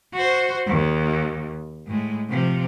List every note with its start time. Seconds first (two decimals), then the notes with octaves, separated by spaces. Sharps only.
0.14 F#4 C5
0.67 D#2
1.87 A2 G#3
2.30 C3 F3